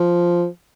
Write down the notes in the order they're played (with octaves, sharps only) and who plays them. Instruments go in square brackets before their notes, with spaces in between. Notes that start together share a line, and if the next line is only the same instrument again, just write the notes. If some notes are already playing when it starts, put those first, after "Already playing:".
Already playing: [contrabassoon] F3